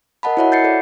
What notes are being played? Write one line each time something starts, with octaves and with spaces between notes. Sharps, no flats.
A#4 D#5 F#5 A5 B5
E4 F#4 C#5 E5 F#5 B5
G6 A6 C7 C#7
A4 D5 E5